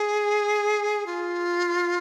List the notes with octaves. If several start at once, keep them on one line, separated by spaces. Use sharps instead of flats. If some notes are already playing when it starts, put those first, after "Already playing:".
Already playing: G#4
F4